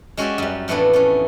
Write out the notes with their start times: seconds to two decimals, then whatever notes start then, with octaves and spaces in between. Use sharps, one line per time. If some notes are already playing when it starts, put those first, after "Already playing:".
0.17 G#3 C#4 F#4 G4 D5 E5
0.38 F#2 G3
0.68 F2 A2 E3 A3 B3 D4
0.93 A3 C#4